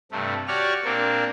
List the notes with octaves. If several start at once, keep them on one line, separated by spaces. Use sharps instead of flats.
G2 C3 A3
F#4 G4 C#5 D5 F6
A#2 A#3 C4 D4